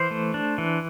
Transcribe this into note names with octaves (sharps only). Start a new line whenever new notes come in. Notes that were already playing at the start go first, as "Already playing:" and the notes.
Already playing: E3 C5
A3
D4
E3